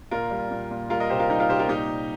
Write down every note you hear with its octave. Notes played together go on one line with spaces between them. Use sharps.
A#2 F4 A#4
G3
A#2
A#2
G3 F4 A#4
A#4 D#5
C3 G4 C5
F4 A#4
G3 D#4 G4
F4 A#4
C3 G4 C5
F4 A#4
A#2 D#4 G4
A#2